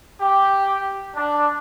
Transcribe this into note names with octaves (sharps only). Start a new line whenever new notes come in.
G4
D4